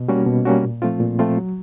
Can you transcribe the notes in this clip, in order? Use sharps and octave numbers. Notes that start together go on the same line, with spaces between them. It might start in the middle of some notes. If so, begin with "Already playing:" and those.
Already playing: B2
G3 A#3 C#4 F#4
B2
G3 A#3 C#4 F#4
A#2
F3 A3 C4 F4
A#2
F3 A3 C4 F4
F#3